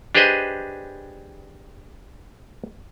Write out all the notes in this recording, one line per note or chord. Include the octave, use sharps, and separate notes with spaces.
D4 G4 G#4 B4 C5 D#5